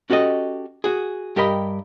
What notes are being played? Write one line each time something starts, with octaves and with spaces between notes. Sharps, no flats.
C#4 F#4 G4 A4 D#5
F#4 G#4
G2 G4 A#4 D#5 B5